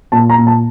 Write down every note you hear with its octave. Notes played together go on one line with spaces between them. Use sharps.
A#2 A5
A#5
A#2
A5